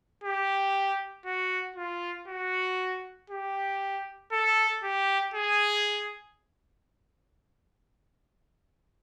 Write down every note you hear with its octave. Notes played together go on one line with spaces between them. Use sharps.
G4
F#4
F4
F#4
G4
A4
G4
G#4